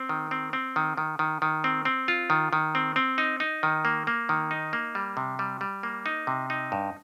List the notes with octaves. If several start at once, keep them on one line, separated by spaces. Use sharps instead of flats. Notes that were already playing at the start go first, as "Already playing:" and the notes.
Already playing: C4
D#3
C4
C4
D#3
D#3
D#3
D#3
C4
C4
F4
D#3
D#3
C4
C4
D#4
D#4
D#3
A#3
A#3
D#3
D#4
A#3
G3
C3
G3
G3
A#3
D#4
C3
D#4
G2